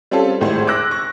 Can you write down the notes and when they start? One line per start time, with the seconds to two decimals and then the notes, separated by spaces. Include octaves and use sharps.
0.11 G3 C4 C#4 F4 A4
0.41 G#1 A2 G#3 C5
0.67 D6 E6 F#6 A#6
0.91 C#6 A#6